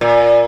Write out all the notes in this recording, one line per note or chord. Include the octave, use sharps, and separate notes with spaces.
A#2